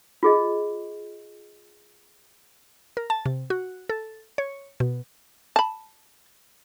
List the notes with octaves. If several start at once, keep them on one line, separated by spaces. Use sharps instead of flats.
F4 G#4 D#5
A#4
A5
C3
F#4
A4
C#5
B2
A5 B5